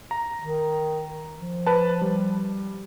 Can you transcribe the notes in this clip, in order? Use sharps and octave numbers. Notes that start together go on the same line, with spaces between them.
A#5
D#3
F3
B4 A5
G3